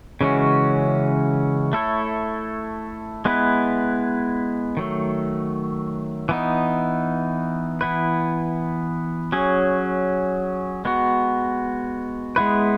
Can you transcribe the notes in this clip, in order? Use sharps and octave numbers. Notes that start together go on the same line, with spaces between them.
C#3 E3 G#3 C#4 F#4
A3 E4 A4 C#5
G#3 B3 E4 B4
D#3 F#3 A3
E3 B3 D#4
E3 B3 E4 B4
F#3 C#4 G#4
G#3 B3 F#4
G#3 B3 E4 B4